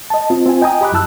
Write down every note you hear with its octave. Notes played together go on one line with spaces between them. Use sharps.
D#5 A5
C4 F4
C4 F4 G#5
D#5 G5 G#5 A#5 D#6
G4 D#5 B5 D6 F#6
F#2 F#3 E4 A5 E6 F#6